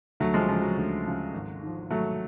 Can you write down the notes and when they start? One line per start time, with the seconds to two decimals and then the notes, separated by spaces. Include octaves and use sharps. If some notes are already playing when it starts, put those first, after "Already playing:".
0.20 D2 F#3 A3
0.34 F3 G#3
0.48 C#3 F3
0.62 F#3
0.77 D2
1.05 C#3 F3
1.34 G#1
1.61 G#2 F3
1.90 G#1 F#3 A3